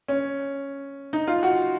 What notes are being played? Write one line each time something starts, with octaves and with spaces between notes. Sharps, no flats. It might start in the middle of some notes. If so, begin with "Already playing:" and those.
C#4
D#4
F4
F#4